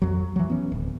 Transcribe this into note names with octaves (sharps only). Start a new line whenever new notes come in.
F2 F#3
E3 F#3
B3 C#4
D1